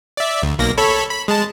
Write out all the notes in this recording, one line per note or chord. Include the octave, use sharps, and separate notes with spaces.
D5 E5
D2
B1 A#3 A#6
A4 C#5 B5
B5
G#3 A5